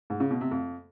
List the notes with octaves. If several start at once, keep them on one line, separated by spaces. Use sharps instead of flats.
G#2
C#3
B2
C3
F2